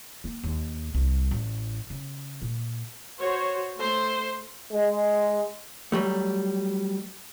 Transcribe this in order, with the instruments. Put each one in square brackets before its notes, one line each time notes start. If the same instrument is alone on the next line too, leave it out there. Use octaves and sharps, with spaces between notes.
[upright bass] A#3
D#2
C2
A1
C#3
A#2
[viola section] F#4 C5 C#5
[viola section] A3 [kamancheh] C5
[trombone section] G#3
[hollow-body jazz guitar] F#3 G3 A3